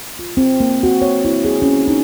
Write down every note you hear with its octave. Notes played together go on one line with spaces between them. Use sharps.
F4
C4
A#3
F#4
C#5
E4
G#4
C#4
D#4